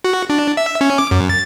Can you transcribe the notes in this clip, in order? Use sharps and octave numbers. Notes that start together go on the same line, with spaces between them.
F#4
D4
E5
C#4
D6
F#2
A6